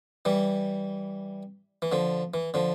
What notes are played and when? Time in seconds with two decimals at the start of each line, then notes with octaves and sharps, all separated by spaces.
0.25 E3 G3
1.82 E3
1.92 D3 F3
2.34 E3
2.54 D3 F3